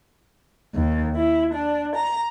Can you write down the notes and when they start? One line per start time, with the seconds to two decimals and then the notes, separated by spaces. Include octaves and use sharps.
0.74 D#2
1.15 E4
1.53 D4
1.95 A#5